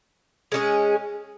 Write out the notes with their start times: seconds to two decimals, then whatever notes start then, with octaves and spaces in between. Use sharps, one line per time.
0.52 G#3 C#4 G#4